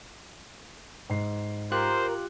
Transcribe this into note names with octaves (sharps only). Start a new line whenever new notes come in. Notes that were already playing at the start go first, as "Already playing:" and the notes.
G#2 C7
F4 G4 A#4 C5 F#6